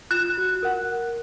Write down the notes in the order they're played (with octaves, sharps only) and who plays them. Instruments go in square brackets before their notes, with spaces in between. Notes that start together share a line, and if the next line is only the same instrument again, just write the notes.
[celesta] F4 E7 [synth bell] F#6
[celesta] F#4
A#4 F#5